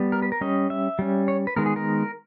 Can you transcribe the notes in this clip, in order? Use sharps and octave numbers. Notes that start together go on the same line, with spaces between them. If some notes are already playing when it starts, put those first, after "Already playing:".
Already playing: G3 B3
A#4
B4
A#4
G3 C#4 D#5
E5
G3 C#4
C#5
B4
D#3 G#3 B3 A#4
G#4
A#4